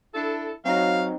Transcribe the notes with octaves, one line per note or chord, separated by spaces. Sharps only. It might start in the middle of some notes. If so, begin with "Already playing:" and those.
D4 E4 A4
F#3 C4 D#4 F5